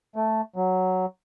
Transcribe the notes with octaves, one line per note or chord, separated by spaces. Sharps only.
A3
F#3